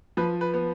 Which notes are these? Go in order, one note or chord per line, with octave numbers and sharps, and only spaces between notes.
F3 B4
B4
B3